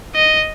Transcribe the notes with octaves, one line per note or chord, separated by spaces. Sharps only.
D#5